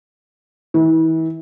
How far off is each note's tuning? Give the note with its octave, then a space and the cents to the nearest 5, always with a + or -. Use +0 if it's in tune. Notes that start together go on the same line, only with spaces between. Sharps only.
E3 -35